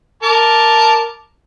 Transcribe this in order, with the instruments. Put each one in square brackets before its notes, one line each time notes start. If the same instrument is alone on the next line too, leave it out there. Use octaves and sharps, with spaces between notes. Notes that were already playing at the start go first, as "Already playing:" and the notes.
[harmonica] A#4 A5 D6